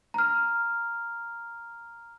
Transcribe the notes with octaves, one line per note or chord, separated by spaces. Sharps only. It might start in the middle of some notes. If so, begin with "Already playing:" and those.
A#5 F6